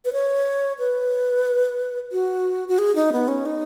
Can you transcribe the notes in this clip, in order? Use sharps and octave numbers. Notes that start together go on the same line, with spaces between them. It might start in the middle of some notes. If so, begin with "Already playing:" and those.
B4
C#5
B4
F#4
F#4
G#4
D#4
B3
C#4
D#4